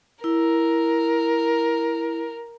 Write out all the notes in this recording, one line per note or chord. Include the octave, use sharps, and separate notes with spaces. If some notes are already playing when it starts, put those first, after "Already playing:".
E4 A#4